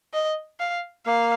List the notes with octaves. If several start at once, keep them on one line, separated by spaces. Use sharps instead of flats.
D#5
F5
A#3 F5